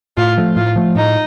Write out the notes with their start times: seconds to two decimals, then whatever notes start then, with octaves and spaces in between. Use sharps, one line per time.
0.17 A2 F4
0.38 F3 A3
0.56 A2 F4
0.76 F3 A3
0.96 A2 D#4